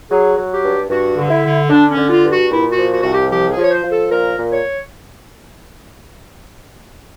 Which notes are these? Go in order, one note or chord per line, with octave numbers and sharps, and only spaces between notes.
F#3 G#4
F#3
G4
G2
G2 F#4
D3
E4
D3
D3 D4
C#4
D3
F4
G2
F#4
A#2 E4
F#4
F3
F#4
C2 F#4
G4
F3 G4
G#4
F3 C#5
C5
F3
A4
A#2 A#4
A#2
C#5